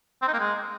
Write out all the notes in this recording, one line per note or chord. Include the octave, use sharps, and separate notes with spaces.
C4
D#4
A#3
G#3